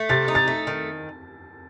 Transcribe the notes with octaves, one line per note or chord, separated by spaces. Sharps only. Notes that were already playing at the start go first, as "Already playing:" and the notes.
Already playing: A3
C3 A6
D#4
A6
A3
D#3